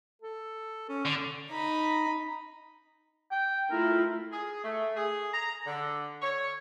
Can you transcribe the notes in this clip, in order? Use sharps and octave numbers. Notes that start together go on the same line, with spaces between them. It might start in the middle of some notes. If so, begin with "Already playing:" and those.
A4
C#4
D3
D#4 B5
G5
A3 E4 F4 A#4
G#4
A3
G#4
A#5
D3
C#5